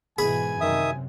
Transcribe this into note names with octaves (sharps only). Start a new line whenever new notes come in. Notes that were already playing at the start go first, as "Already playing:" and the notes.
G#2 B2 E3 G#4 G#5 B5
F#2 C3 D#3 E5 D#6